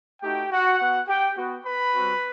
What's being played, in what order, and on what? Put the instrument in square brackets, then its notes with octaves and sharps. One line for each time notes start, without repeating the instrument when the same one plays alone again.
[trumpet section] A3 D#4 F#4 G4 G5
F#4 F#5
B3 F#4
G4 G5
B3 F#4
B4 B5
G3 C4 F#4